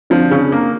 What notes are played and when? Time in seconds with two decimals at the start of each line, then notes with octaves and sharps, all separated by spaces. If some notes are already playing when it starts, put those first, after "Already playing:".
0.10 F3 C4 D4
0.31 C#3
0.52 A#3